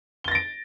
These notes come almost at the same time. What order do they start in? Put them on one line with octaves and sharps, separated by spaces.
G7 A6 A#6 D7